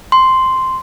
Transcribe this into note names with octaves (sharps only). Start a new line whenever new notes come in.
C6